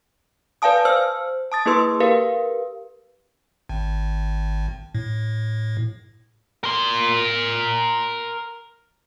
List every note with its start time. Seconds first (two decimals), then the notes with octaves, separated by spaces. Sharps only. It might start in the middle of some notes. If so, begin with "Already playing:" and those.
0.62 B4 D5 F5 G#5 A5 D#6
0.85 C5 E6 F6
1.52 A5 D#6 A6
1.66 A#3 E4 G#4 B4 C6 E6
2.00 G4 A#4 B4 F5
3.69 G#1
4.95 A2
6.64 A#4 C6